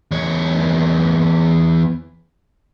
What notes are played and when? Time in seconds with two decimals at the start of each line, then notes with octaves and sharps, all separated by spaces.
0.11 E2 C#5